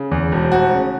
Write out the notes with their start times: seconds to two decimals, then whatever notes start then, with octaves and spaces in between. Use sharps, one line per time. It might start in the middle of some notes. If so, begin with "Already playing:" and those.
Already playing: C#3
0.11 E2
0.32 E1
0.52 F1 F#4
0.73 C#3